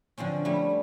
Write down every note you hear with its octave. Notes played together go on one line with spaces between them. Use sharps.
D3 F3 C4 C#4
G3 A3 E4